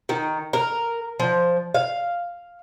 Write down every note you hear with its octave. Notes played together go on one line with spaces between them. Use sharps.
D#3
A#4
F3
F5